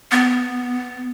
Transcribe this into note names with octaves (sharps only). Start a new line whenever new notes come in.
B3